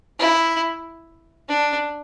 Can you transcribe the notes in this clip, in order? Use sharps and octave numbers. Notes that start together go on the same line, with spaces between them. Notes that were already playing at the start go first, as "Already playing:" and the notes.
E4
D4